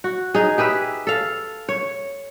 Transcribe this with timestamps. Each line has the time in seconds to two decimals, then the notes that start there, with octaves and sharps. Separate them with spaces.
0.04 F#4
0.34 D#4 G#4
0.58 G4 G#4 B4 E5
1.07 A4 F5
1.69 C#5